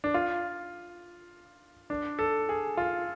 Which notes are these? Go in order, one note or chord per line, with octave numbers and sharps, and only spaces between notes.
D4
F4
D4
A4
G#4
F4